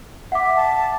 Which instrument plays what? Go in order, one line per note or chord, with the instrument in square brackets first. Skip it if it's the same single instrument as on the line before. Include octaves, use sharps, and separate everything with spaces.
[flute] E5 [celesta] F#5 D6
[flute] A5